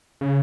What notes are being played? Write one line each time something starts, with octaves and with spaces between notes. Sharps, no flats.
C#3